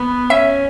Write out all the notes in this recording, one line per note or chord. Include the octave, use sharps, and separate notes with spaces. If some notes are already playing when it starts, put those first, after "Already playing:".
Already playing: B3
C#4 E5